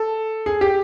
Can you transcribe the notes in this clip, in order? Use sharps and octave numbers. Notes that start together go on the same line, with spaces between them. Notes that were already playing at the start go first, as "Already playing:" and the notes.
Already playing: A4
G#4
G4